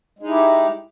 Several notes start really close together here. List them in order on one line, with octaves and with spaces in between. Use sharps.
G#3 D#4 E4 G4